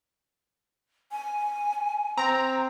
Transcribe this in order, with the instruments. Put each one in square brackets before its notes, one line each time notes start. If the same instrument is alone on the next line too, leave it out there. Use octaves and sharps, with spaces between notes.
[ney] G#5
[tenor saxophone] C4 [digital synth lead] A#5